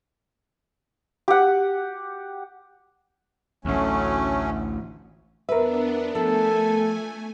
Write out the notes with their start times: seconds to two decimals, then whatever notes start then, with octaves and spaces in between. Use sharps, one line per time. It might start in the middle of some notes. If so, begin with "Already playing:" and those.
1.28 G4 F#5
3.65 A1 D2 F#3 A3 C#4
5.49 E2 B3 D4 A#4 B4 E5
6.15 F3 A3 A4 G#5